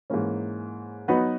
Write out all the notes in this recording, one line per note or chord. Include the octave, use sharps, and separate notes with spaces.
G#2 E3 A#3 C#4
F#3 B3 D#4 F#4 B4